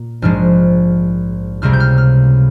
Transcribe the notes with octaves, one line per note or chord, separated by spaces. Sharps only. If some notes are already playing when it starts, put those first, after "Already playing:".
Already playing: A#2 A#3
A#1 G#2 F3 G#3 F6
C#2 C3 G3 A#3 F6
G6
F6
F6